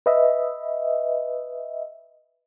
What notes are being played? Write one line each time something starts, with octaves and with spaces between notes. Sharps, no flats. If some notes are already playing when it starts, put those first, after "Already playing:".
B4 D#5 E5